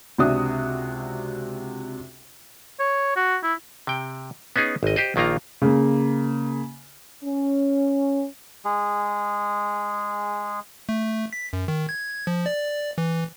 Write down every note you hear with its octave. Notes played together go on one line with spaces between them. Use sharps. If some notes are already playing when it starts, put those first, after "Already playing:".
C#2 C3 D4 F#4 E5 D#6
C#5
F#4
E4
C3 G5
B3 C#4 D#4 G#4
G#1 D#5
G4 C5 D#5
A#1 D#3 A#3 F4 A#5
C#3 A#3
C#4
G#3 G#4
A3
B6
F#2
D#3
G#6
F3
D5
E3